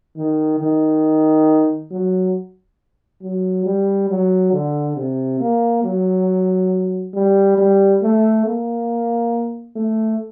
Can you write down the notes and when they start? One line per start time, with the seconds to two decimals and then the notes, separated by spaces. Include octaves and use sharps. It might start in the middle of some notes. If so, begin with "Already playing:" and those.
0.16 D#3
0.59 D#3
1.91 F#3
3.22 F#3
3.66 G3
4.09 F#3
4.53 D3
4.96 C3
5.40 A#3
5.84 F#3
7.14 G3
7.57 G3
8.02 A3
8.46 A#3
9.75 A3